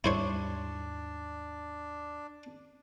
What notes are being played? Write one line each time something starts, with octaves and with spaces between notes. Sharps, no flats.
D#2 G#2 G3 D4 E4 C5 C#5